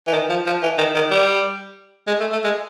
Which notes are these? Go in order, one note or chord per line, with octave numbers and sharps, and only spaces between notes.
E3
D#3
F3
F3
E3
D#3
D#3
G3
G#3
A3
A3
G#3